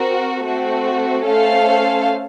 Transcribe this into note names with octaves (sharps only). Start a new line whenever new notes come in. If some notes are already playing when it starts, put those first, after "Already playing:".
Already playing: C4 F#4 A#4
A3 C4 F#4
A3 C#4 A4 C5 F5